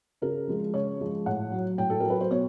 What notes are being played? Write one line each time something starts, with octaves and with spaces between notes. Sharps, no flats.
C#3 A#4
F3 G#3
C#3 C#5
F3 G#3
A2 F#5
F#3
A2 G5
A4
F#3 A#4
B4
C5
B2 C#5